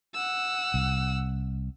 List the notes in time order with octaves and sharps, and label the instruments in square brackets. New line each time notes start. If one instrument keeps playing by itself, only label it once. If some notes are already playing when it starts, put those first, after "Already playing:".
[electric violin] F#5 E6
[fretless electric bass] C2